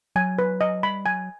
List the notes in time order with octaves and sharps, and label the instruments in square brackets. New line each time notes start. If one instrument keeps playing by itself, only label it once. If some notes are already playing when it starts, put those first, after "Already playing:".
[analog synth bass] F#3 [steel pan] G#5
[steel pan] B4
D#5
[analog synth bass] G3 [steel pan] B5
[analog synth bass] F#3 [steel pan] G#5